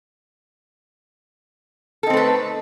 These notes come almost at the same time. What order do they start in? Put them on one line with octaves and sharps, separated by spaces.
A4 D#4 C4 A3 B4